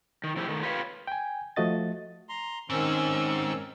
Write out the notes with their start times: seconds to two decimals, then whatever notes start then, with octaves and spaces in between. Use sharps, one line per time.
0.24 D#3
0.36 A2 F3 E4 F#4 G4
0.48 D#3 A3
0.63 F4 G4 B4 C#5 F5
1.07 G5 G#5
1.56 F3 A3 F#4 D#5 A6
2.29 A#5 C6
2.70 G#2 D#3 C4 C#4 E6